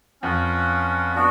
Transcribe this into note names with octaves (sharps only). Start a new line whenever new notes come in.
F2 C#4 F4 B4 F#5
B3 D4 F#4